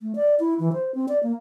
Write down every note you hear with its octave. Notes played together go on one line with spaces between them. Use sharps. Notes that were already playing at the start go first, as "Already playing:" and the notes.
A3
D5
E4
E3
C5
C4
D5
A#3